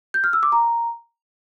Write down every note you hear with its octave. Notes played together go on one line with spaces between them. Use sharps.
G6
F6
E6
D6
A#5